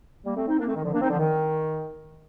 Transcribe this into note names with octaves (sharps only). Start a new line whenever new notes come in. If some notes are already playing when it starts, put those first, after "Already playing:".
G3 A#3
A3 C4
C4 D#4
A#3 D4
A3 C4
D#3
D3 F3
A#3 D4
C4 D#4
D3 F3
D#3